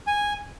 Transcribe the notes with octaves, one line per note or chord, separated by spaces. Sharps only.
G#5